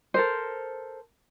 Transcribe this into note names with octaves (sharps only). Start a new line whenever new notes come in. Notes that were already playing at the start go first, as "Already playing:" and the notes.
A4 A#4 C5